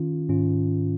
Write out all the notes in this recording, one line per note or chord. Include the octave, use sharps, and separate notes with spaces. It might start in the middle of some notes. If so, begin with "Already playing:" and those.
Already playing: D#3 C#4 F4
G#2 D#3 C#4 F4